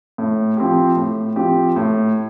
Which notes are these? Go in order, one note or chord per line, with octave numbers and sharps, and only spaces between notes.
A2
F3 C4 G4
A2
F3 C4 G4
A2